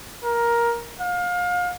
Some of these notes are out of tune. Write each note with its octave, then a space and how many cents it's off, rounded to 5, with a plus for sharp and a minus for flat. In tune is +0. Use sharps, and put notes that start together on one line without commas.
A#4 +10
F5 +30